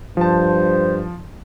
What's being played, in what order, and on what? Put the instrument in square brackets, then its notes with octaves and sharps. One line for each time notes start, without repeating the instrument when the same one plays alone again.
[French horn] G2 [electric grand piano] F3 A5 [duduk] C5